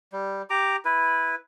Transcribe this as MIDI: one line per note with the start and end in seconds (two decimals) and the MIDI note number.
0.12 0.42 55
0.50 0.76 67
0.50 0.76 82
0.50 0.76 86
0.85 1.35 64
0.85 1.35 71